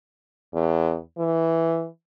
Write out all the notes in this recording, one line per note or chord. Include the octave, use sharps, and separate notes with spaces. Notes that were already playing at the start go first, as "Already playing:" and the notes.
E2
E3